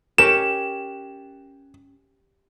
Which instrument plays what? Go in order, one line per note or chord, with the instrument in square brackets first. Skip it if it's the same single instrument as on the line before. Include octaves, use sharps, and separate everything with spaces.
[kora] C#4 G4 A#4 [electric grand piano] E7